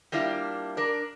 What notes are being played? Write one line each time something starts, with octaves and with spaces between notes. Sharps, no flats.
G3 A#3 D4 E4 F4
D4 A#4